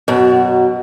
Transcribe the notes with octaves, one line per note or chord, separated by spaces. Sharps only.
F#2 B2